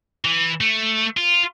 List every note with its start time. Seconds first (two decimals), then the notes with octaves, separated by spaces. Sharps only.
0.25 E3
0.61 A3
1.17 F4